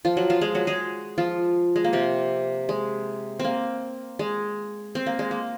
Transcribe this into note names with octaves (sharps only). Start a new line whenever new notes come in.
F3 F4
F#3 F#4
F3 F4
G#3 G#4
F#3 F#4
G#3 G#4
F3 F4
G#3
A#3
C3 C4
G#3
C4
A#3
G#3
C4
A#3
G#3
A#3